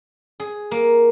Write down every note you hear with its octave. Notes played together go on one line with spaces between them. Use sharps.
G#4
A#3